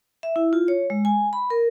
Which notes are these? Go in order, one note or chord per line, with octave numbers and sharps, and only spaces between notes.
E5
E4
F4
C#5
G#3
G#5
B5
A#4